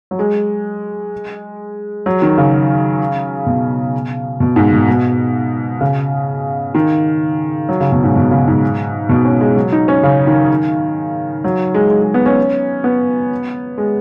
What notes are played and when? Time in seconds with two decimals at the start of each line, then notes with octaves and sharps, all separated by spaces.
0.11 F#3
0.19 G#3
2.06 F#3
2.22 D#3
2.38 C#3
3.46 B2
4.40 B2
4.56 G#2
4.72 B2
4.88 B2
5.81 C#3
6.75 D#3
7.69 F#3
7.81 C#3
7.92 B2
8.03 G#2
8.16 B2
8.31 C#3
8.47 G#2
9.09 B2
9.25 C#4
9.41 G#3
9.56 F#3
9.72 D#4
9.88 C#4
10.03 C#3
10.27 D#3
11.44 F#3
11.74 G#3
11.90 G#3
12.02 G#3
12.14 B3
12.26 C#4
12.84 B3
13.78 G#3